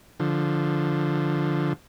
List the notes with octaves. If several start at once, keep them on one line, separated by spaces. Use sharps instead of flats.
D3 F3